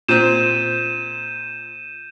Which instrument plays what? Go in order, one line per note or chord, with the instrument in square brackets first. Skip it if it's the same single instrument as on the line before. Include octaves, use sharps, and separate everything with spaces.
[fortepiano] A#2 C4 [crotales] G6 D#7 E7